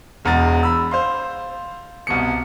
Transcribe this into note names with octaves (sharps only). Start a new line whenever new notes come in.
E1 E2 G#3 A#5 A6
B5 E6
C5 F5 C6
C2 B2 C#7